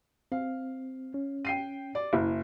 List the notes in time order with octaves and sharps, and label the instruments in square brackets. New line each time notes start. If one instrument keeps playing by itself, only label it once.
[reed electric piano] C4 [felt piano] F5
[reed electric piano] C#4
[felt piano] G5 C7 D#7
D5
[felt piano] F#1 [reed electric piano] E4